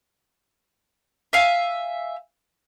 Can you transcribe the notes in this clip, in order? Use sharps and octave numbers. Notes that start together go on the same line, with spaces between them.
E5 F5 G#5